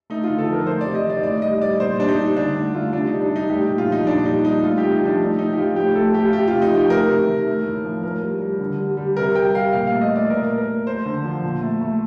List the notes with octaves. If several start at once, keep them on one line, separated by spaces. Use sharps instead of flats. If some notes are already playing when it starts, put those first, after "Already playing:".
A3 D#4
F4
D3
A4
F3 A#4
A3 C5
C3 D5
D#5
D#3
D5
A2 D5
G3 D#5
G3 D5
A#2 C5
G3 D4
D#4
G3
D3 D4
A3
A3 F4
C3 D4
D#4
G3
D4
G3 D#4
A3 G4
A#2
F4
F3 D#4
A#2 D4
G3 D#4
G3 D#4
A3 F4
C3 G4
D#4
F3 D4
A3 D#4
A2 D#4
G4
F3 F4
A2 G4
A3 A4
A3 G4
F4
A3 G4
C3 F4
D#4
F3 G4
A3 A#4
C3
D#3
A3
A2
F3
A2 A#4
G3
G3
D3
G3
G3
C3 A#4
G3 G5
G3 F5
A#2 F5
F5
A3
D#5
A3 D5
A#2 A#4
A3
A#4
A3
A3 C5
D3
F3
A#2
A3
A3